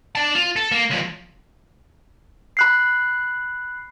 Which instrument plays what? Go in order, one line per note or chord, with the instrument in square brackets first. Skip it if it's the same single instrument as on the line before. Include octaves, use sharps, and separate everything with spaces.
[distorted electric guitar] D5 A5
F4
A4
A#3
C#2 F3
[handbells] B5 F#6 C7